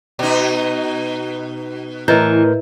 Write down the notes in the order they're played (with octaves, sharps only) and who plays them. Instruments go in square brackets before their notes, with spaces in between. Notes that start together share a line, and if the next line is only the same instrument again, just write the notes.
[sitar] B2 D#4
[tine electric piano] A2 A#4 G6 [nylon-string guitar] E3 [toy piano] E4 D#5